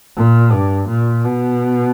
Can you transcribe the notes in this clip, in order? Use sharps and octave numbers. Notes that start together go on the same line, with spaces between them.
A#2
G2
A#2
B2